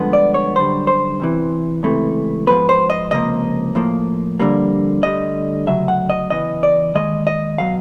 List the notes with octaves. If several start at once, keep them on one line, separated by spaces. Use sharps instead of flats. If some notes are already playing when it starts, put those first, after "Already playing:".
Already playing: G2 D3 F3 G#3 B3
D5
C#5
F#2 D3 G3 C5
C5
E2 C3 E3
C#2 C3 E3 A3
G#2 F3 G#3 B3 B4
C5
D#5
C#2 C3 F3 A#3 D#5
A2 F3 A#3
F2 D3 G3 A#3
D2 D3 G3 D#5
D2 C#3 F#3 E5
F#5
D#5
E2 C#3 E3 B3 D#5
D5
D#2 D#3 G#3 D#5
D#5
B2 F#3 F5